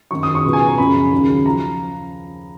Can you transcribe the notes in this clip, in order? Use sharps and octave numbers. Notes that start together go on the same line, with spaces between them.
F#2 D#3 F#3 C#6
D#6
C#6
C#2 B2 F#3
G#5
A#5
F#2 C#3 F3 B5
D#2 C#3 F#3
F3 A#5